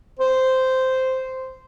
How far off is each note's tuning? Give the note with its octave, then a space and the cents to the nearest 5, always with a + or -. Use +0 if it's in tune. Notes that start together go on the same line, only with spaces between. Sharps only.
C5 -10